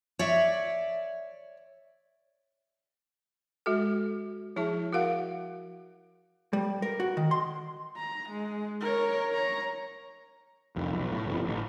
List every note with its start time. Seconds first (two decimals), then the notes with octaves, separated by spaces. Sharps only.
0.19 C#5 D5 E5
3.66 G#3 F#4 A4
4.56 F3 E4 G#4 E5 A5
4.93 F#4 A#4 F5 F#5
6.53 G3
6.82 A#4
7.00 F#4
7.17 D#3
7.31 C6
7.97 A#5
8.30 G#3
8.80 A#4 C#5
9.32 C#5 A#5
10.76 F1 C2 F2
10.90 B1
11.12 A2
11.26 G1 F2
11.46 A1